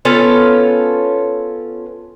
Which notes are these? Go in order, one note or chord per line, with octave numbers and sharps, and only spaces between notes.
B3 C#4 F4 A4